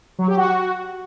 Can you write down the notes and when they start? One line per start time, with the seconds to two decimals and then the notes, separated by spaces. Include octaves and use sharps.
0.19 F#3
0.28 G4
0.37 F#4